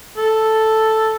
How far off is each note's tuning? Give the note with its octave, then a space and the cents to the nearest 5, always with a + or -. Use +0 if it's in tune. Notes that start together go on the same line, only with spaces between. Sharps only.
A4 +0